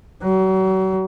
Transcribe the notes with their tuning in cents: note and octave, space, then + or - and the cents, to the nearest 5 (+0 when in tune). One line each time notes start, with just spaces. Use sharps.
F#3 +40